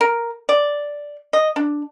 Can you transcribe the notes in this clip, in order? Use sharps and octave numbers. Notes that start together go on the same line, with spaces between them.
A#4
D5
D#5
D4